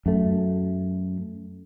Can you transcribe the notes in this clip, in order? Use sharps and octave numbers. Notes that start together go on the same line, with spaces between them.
F#2 A3